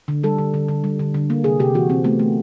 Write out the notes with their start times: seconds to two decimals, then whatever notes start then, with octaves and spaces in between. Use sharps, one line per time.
0.08 D3
0.24 G3 A4
0.39 D3
0.54 D3
0.69 D3
0.84 G3
0.99 D3
1.14 D3
1.30 A#3
1.44 C3 G#4
1.60 C3 G4
1.74 E3 F#4
1.89 C3 C4
2.04 A3 B3
2.19 A3